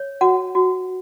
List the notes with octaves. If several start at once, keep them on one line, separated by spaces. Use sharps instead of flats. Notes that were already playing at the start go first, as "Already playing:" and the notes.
Already playing: C#5
F#4 F#5
F#4